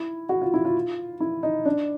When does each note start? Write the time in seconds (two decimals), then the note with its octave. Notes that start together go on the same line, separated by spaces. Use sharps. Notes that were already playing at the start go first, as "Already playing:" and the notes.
Already playing: E4
0.29 F#4
0.42 F4
0.54 E4
0.65 F4
1.20 E4
1.43 D#4
1.65 D4